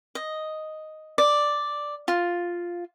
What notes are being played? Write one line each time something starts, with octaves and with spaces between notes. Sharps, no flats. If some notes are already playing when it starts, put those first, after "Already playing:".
D#5
D5
F4